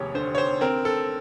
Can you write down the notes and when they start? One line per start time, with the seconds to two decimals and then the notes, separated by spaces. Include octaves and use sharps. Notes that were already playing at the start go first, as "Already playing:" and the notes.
Already playing: F1 D#2 G4 G#4 C#5
0.14 D3 C5
0.35 C#5
0.38 C5
0.61 C4 A#4
0.85 A4